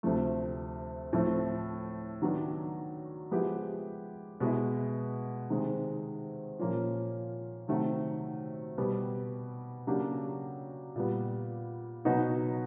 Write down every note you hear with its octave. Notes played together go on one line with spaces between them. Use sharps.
D2 C3 F3 A3
A2 F3 A3 C4
D#3 F#3 B3 D4
F3 G#3 B3 E4 G4
B2 G#3 B3 E4
C3 D#3 G#3
A#2 F3 A#3 C#4 F4
C3 D#3 F#3 A3
B2 G3 B3
C#3 F#3 A#3 D4 G4
A#2 G3 B3
B2 F#3 B3 D#4 F#4